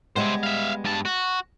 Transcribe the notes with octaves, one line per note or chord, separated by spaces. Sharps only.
G3 G#3 B3 C5 E5
E5 F5
G2 A5
F#4